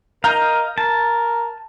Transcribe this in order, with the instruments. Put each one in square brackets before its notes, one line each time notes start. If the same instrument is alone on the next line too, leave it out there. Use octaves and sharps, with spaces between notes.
[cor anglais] A#4 [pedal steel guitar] D#5 F5 [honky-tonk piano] A#5 G6
[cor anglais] A#4 [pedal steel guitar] A5